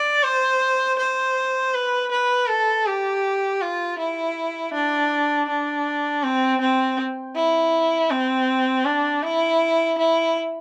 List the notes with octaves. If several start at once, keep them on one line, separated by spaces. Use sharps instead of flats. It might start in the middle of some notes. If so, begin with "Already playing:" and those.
Already playing: D5
C5
C5
B4
B4
A4
G4
F4
E4
D4
D4
C4
C4
E4
C4
D4
E4
E4